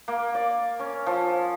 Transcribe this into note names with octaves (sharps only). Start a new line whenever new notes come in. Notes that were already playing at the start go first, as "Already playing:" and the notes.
A#3
D5
C#4
F3